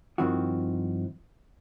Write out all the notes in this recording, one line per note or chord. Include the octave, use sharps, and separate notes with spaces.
G2 D#3 F3 C4 E4 F#4